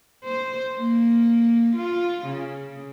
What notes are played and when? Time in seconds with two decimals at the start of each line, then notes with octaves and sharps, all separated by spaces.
0.24 C5
0.77 A#3
1.76 F4
2.26 C#3